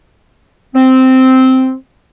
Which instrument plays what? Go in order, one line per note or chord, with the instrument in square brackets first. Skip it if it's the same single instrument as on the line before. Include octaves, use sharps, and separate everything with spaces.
[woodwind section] C4